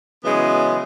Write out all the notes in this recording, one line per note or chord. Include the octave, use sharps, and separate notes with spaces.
C#3 E3 F#3 G#3 B3